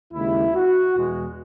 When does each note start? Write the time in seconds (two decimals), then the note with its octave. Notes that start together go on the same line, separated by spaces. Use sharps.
0.14 D#2 C#3 G#3 E4
0.55 F#4
0.97 E2 B2 G#3